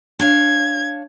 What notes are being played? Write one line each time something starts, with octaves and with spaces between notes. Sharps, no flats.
D4 C#5 F5 G#6